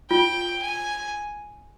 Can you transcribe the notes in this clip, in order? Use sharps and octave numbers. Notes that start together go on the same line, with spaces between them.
F4 G5
G#5